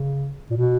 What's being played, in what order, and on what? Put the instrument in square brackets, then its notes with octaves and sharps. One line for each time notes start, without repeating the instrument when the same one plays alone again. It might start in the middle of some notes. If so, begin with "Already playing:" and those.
Already playing: [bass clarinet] C#3
A#2
B2